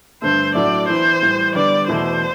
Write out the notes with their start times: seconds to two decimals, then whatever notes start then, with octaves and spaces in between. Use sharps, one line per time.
0.22 G2 D3 A3 C5
0.55 A2 F#3 A3 D4 F#4 D5
0.88 E3 B3 E4 B4 C5
1.22 A2 E3 G3
1.55 D3 G3 B3 D5
1.88 E2 B2 A3 E4 C5